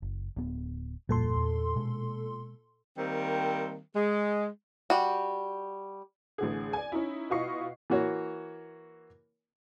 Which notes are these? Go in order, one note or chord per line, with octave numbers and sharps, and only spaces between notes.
F#1
D1 B3
D1 F2 A#2 G3 A4 C6
E2
B2 G#3
D#3 G3 A#3 C4
G#3
G3 F#4
A1 D3 G#4
D5 G#5
C#4 D#4 E4
B2 E4 F4 D#5 C#6 C7
E3 A#3 F#4 C#5